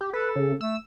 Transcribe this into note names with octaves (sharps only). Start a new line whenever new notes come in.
G4
A4 B4
C#3
A3 E6